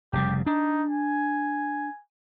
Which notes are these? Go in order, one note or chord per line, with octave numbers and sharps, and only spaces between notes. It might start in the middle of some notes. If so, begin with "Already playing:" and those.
F1 C#3 G3 G4
D4 D#4
G#5